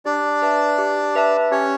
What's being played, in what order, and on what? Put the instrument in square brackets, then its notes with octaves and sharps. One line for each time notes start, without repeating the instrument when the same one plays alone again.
[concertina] D4 D5 [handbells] G4
[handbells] B4 E5 A5
G4
B4 E5 A5
[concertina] C#4 C#5 [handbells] G4